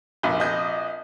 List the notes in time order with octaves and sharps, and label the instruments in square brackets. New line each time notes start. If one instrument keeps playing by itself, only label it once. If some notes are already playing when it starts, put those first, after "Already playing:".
[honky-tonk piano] F1 [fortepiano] A#1
[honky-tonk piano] D#5 G6